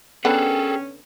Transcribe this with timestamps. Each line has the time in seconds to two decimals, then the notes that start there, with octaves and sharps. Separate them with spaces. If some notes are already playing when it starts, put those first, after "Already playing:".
0.25 D3 B3 C#4 G#4 A4 F#5 G5